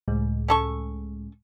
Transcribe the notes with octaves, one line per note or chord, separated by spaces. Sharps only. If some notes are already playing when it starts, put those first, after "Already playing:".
C#2 A2 G#3
C#4 A4 C#6